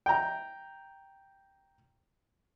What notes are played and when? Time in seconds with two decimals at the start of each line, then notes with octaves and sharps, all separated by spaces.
0.06 G5 A#5